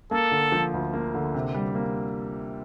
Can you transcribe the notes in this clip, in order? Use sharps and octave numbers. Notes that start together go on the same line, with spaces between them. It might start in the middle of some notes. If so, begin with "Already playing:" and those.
A#3 A4
D3
F3
D2
A#3
D3
C3
G3
A#3